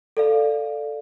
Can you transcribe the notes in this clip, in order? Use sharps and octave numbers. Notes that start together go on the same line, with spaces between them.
A4 D5 F5